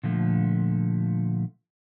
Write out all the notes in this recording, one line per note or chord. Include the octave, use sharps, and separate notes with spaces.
A#2 D3 F3 A3